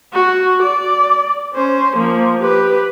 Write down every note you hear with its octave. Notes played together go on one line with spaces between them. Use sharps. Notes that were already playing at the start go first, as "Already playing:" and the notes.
F#4
D5
C#4 C5
F3 A#3
G4 B4